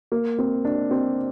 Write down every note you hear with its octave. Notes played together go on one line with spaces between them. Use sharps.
A#3
C4
D4
C4